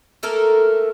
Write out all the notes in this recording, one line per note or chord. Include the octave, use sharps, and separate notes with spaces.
A3 A#3 A4 A#4